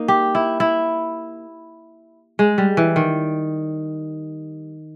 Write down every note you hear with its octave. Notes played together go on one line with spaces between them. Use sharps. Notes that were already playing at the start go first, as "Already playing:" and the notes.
Already playing: A#3 D#4
G4
E4
E4
G#3
G3
E3
D#3